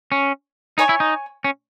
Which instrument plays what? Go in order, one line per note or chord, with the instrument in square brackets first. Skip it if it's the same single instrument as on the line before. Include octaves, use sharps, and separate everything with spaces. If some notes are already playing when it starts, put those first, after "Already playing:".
[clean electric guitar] C#4
[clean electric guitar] D#4 [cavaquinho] C#5 G#5 C#6
[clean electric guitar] E4
D#4
C#4